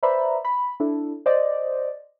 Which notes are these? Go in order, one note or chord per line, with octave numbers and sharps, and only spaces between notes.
B4 C5 D5 E5 A#5 B5
B5
D4 E4 A4
C5 D5 D#5